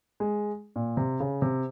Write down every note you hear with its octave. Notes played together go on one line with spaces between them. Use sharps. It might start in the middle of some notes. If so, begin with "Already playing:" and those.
G#3
A#2
C3
C#3
C3